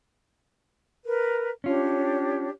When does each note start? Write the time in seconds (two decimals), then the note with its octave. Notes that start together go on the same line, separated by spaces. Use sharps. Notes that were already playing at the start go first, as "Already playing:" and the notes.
1.05 A#4 B4
1.64 C#4 D4 F4 G4 C#5